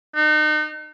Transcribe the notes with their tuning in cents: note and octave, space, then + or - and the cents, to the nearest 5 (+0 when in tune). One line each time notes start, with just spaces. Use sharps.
D#4 -35